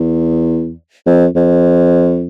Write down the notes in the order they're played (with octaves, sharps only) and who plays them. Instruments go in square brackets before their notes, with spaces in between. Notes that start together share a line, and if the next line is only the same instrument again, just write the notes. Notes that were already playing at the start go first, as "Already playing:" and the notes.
Already playing: [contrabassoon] E2
F2
F2